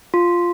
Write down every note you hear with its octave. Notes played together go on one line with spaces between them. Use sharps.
F4